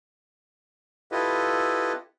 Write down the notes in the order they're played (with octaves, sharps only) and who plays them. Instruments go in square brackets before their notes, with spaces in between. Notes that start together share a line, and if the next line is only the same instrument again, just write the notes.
[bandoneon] E4 F4 G4 A4 B4 D#5